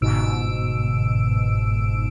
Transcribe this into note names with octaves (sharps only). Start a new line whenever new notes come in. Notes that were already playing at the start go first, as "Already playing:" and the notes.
G1 G#2 B2 E6 D7